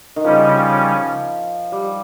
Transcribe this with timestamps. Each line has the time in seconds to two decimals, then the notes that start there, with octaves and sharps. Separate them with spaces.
0.16 D#3
0.24 C#3 F3 G3 C#4
0.49 F3
1.72 G3